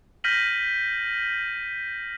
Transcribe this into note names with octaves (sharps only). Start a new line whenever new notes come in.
F6 G6 A#6 B6 D#7 F#7